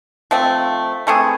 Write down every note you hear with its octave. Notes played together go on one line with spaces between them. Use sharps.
F3 A3 C4
E3 A3 C4 G#4